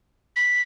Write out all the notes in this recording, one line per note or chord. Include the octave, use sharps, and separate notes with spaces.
B6